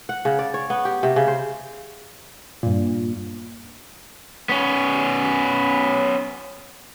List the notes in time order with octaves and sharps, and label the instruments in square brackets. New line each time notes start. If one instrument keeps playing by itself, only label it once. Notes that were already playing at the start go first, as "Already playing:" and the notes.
[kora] F#5
C#3
D5
C#5
B3
G4
C3
C#3
C5
[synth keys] G2 A#2
[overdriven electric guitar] B3 C#4